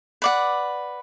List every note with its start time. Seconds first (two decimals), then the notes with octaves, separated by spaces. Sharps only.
0.22 B4 D5 F#5